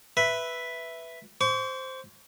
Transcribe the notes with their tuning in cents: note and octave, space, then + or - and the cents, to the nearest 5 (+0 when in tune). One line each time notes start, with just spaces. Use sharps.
B4 +0 E5 +0
C5 +0 C#6 +45